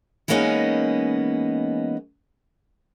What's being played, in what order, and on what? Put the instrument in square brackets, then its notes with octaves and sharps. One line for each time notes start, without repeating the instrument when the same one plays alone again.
[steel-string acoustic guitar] E3 G#3 A#3 B3 C#4 D#4